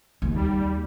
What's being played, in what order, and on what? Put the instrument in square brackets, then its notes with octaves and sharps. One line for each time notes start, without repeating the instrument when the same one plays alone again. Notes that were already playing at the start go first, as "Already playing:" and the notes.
[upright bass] D#2
[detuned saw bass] G3